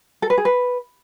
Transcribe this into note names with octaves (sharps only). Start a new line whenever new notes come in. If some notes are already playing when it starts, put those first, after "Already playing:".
A4
B4
G#4
B4